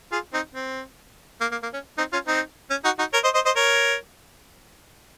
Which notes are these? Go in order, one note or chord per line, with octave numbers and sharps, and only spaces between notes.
F4 G#4
C4 D#4
C4
A#3
A#3
A#3
C#4
C4 D#4
C#4 F4
C4 D#4
C#4
D#4 F#4
D#4 F#4
A#4 C#5
C5 D#5
C5 D#5
C5 D#5
A#4 C#5